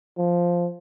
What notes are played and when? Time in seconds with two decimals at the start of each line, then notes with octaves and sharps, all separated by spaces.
0.18 F3